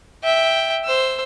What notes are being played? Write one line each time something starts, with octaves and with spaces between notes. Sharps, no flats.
E5 G5
C5 E6